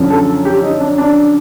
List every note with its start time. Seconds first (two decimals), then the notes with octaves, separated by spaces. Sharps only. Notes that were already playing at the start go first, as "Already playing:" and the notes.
Already playing: F#2 D3 F3
0.10 A4
0.45 G4
0.63 D#4
0.80 D4
0.98 D4